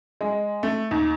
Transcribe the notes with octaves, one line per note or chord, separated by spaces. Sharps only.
G#3
A3
D#2